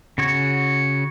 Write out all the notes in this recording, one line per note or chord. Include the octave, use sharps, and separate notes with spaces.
C#3 F#4 C#5